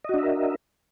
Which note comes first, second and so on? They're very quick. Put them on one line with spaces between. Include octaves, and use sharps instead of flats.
D#5 F#4 D4 E5 A#4